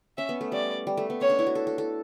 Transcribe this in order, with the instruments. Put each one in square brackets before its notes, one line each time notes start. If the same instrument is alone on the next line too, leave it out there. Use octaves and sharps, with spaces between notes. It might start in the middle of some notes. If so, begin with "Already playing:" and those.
[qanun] C#4 [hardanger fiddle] E5
[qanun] B3
A3
[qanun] G3 [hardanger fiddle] D5
[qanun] G3
A3
B3
[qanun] C#4 [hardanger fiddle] C#5
[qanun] D4
E4
F#4
A4
A4
A4